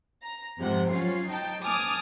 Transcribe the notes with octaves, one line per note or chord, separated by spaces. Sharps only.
A#5
F2 G#2 C3 F#5
F#3 C#4 F4 C7
D#4 G5 A5
G#5 A5 D6 D#6 F6